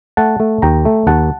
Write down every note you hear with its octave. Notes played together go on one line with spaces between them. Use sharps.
A3 F#5 A5
A3
D#2 G5 A#5
A3
D#2 F#5 A5